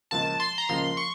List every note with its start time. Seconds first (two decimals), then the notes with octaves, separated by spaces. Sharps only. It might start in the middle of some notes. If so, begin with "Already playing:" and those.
0.11 C#2 C#3 F3 A#3 F4 A5
0.40 C6
0.58 A#5
0.69 C#2 C#3 F3 A#3 F4 C6
0.97 C#6